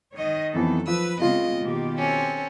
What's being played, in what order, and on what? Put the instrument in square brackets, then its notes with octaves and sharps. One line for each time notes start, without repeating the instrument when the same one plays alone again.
[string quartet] D#3 [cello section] C#5 D#5
[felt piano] F2 E3 B3 [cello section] F#3 A4
[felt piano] F3 [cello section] B4 [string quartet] E6
[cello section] C#3 B3 C4 [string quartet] G#3 D#5 [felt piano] F4
[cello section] B2 D#3 G4 [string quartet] A#3
[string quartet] C4 C#4 A4